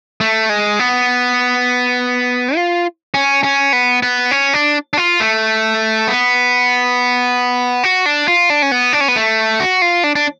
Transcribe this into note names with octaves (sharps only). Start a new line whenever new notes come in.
A3
G#3
B3
F4
C#4
C#4
B3
B3
C#4
D4
D4
F4
A3
B3
F#4
D4
F4
D4
C#4
B3
D4
C#4
B3
A3
F#4
F4
D4
D4